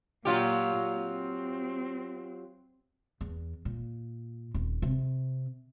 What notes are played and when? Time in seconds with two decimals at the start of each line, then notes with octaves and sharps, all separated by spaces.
0.25 A#2 F#3 F4 G4
0.93 C4
3.21 E2
3.65 A#2
4.54 D#1
4.82 C3